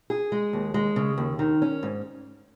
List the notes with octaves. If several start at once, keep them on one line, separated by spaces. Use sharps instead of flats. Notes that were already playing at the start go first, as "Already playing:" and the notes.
G#4
G#3
D#2
G#3
C#3
D#2
D#3
C#4
G#2